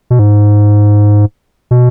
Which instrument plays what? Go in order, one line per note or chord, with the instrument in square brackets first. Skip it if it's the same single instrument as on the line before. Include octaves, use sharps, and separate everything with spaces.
[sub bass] B2
G#2
B2